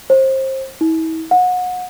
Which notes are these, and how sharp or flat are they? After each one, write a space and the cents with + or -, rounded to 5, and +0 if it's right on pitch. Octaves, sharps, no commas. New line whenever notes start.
C5 +25
E4 -40
F#5 -30